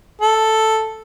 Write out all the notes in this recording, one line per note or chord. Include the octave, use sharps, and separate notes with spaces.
A4